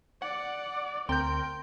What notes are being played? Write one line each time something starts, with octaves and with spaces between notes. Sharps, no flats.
D5 F#5
D2 C4 A#4 G5 A#5 C6 G6